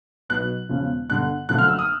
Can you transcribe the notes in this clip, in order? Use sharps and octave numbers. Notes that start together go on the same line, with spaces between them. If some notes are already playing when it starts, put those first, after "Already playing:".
B1 B2 F#3 B3 F#6
E1 E2 C#3 F3
G1 G2 D3 F#6
F#1 F#2 D3 F3 A3 F#6
F6
E6
D#6